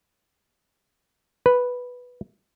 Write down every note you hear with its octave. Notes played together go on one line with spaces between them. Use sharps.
B4